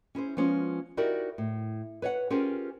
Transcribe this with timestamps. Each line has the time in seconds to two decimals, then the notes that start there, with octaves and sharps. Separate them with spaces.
0.15 C#4 E4 G#4 C5
0.37 F3 G#3 B3 C#4 F4
0.97 D#4 E4 F#4 G4 A#4 D5
1.38 A2
2.02 B4 C#5 D#5 F#5
2.30 C#4 F4 G4 G#4 A#4 C5